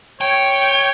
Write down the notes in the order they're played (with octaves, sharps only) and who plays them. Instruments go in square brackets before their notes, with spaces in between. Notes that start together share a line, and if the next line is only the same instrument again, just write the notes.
[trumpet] C#5 [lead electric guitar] G5